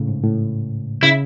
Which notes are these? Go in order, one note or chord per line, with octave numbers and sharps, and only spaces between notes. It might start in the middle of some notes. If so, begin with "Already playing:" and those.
Already playing: A2 C#3
G#2
A2
C#3 E4